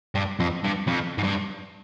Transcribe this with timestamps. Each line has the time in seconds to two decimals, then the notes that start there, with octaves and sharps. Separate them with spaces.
0.15 G2
0.40 F2
0.64 G2
0.87 F2
1.18 G#2
1.23 G2